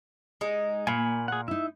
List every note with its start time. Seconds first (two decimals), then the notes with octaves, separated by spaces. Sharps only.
0.41 G#3 D#4
0.87 A#2 A#3 G#5 B5
1.28 G#4 F#5
1.48 D#4 E4 E5